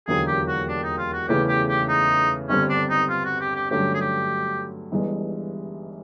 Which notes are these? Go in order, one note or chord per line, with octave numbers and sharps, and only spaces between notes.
E1 D#2 D3 F#3 A#3 G#4
G4
F#4
D4
D#4
F4
F#4
E2 C#3 E3 A3 C#4 G4
G4
G4
D#4
G1 G2 D3 G3 C4 C#4
D4
D#4
F4
F#4
G4
G4
G2 D3 F#3 A3 C#4 G4
G#4
G4
G1 G2 E3 G#3